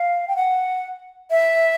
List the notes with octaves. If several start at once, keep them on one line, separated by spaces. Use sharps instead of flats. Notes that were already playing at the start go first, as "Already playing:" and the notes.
Already playing: F5
G5
F#5
E5